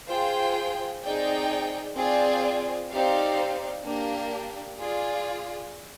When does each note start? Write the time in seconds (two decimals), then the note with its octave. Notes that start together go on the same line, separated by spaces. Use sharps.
0.09 F4 G#4 C5 G5
1.03 C4 D#4 G#4 D5 G5
1.97 C4 F4 G#4 D5 G#5
2.90 C4 D#4 G4 D5 F5
3.84 A#3 D4 G4
4.78 F4 G#4 D5